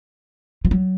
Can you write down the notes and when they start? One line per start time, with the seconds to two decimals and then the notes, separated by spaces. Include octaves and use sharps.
0.65 F3
0.71 F#3